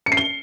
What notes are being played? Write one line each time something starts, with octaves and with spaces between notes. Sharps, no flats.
C#7
C7
G7